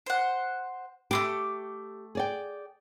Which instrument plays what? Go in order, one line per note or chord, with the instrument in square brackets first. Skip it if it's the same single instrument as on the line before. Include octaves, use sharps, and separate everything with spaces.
[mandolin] C5 F#5
[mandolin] A3 C4 D6 [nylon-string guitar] G4
[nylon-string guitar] G#4 D5 G5